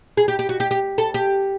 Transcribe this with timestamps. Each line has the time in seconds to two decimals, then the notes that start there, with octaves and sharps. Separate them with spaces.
0.17 G#4
0.28 G4
0.39 G4
0.49 F#4
0.60 G4
0.71 G4
0.98 A4
1.14 G4